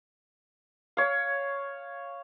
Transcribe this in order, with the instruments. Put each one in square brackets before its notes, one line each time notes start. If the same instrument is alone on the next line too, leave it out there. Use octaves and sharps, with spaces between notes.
[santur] C#5 F5